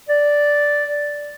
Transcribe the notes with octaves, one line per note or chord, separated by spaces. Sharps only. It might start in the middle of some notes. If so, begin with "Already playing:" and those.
D5